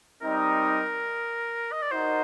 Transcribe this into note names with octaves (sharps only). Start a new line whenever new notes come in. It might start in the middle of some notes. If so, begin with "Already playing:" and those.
G3 C4 D#4 A#4
D#5
D5
D#4 F#4 A#4 C5